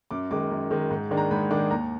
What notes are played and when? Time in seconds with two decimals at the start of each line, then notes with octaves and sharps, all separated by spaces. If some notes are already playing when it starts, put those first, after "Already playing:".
0.11 F#2 D6
0.31 D#3 G#3 D6
0.51 F#2
0.71 D#3 G#3
0.91 G#2
1.11 D#3 G#3 D4
1.17 A#5
1.31 G#2 B5
1.51 D#3 G#3 D4 D6
1.71 D#2 A#5